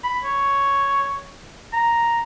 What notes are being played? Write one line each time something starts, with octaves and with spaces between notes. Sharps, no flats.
B5
C#5
A#5